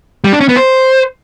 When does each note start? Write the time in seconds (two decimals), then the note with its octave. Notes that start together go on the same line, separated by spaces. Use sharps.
0.24 G3
0.32 D4
0.41 C#4
0.49 B3
0.57 C5